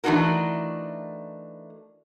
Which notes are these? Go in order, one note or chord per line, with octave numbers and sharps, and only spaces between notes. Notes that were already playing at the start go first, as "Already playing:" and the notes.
E3 A3 D4 D#4 F#4 A#4